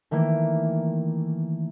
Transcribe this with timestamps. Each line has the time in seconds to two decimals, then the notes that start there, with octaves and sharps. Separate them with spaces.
0.11 D#3 E3 A3 A#3